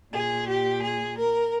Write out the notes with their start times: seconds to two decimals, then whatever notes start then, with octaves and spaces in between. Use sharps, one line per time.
0.13 A#2 G#4
0.49 G4
0.83 G#4
1.18 A#4